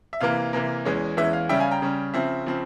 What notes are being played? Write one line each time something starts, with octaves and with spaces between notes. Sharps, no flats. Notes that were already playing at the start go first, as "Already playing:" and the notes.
E5
C3 E3 A#3 F5
C3 E3 A#3
E2 E3 G#3 C#4
E2 E3 G#3 C#4 E5
F5
C#3 G3 C#4 E5 G5
F5 G#5
G5 A#5
C#3 G3 C#4
C#3 F3 C4 E5
C#3 F3 C4